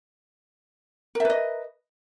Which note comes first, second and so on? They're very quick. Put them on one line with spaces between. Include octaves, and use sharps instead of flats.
A#4 E5 B4 D#5